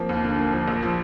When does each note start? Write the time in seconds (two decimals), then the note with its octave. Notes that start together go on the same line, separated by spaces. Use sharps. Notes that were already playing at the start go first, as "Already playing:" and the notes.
Already playing: F3 A#3 C4
0.09 D#2
0.24 D3
0.39 A#3
0.52 F3
0.68 A#1
0.83 F3